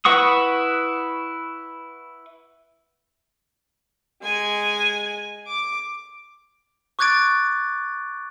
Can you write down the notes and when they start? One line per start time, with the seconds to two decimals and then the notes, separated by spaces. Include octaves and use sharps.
0.05 E4 B4 F#5 C#6 D#6
4.22 G#3 G#5
5.47 D6
6.99 C#6 D6 F#6 G#6 A6 D7